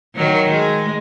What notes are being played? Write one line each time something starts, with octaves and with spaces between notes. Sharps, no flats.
D#3 F#3
G#3